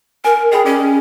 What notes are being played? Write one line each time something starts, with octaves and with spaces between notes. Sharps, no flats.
A#4 G#5
G#4 D#5 G5 B5
C#4 G#4 D5